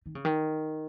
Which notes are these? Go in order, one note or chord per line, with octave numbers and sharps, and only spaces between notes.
D#3
C#3
D#3